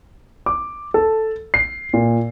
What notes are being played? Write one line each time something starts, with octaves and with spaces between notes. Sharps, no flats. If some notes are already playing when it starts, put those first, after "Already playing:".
D6
A4
C7
A#2